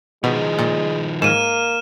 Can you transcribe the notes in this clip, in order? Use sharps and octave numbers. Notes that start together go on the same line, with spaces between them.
B2 D#3 F3 G#3
A#2
G#2 A#3 F6 D#7 E7